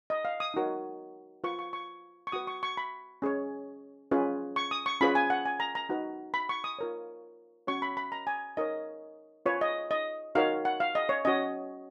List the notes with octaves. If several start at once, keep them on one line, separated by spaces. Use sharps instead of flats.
D#5
F5
D#6
D#4 F#4 A#4 C#5
F4 B4 C#6
C#6
C#6
C#6
F#4 B4 D#6
C#6
C#6
B5
C#4 G#4 C#5
C#4 F4 G#4 B4
C#6
D#6
C#6
C#4 F4 G#4 B4 B5
G#5
F#5
G#5
A#5
A#5
D#4 F#4 B4
B5
C#6
D#6
F4 A#4 C#5
C#4 F#4 C#5 C#6
B5
B5
A#5
G#5
D#4 A#4 C#5 D#5
F4 B4 C#5
D#5
D#5
D#4 F#4 A#4 C#5 F5
F#5
F5
D#5
C#5
C#4 F#4 C#5 D#5